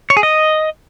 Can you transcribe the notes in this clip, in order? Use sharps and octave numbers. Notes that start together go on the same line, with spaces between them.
C#5
G#4
D#5